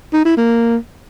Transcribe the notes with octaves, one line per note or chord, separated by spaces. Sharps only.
D#4
E4
A#3